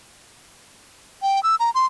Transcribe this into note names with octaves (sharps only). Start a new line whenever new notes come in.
G5
E6
A#5
C6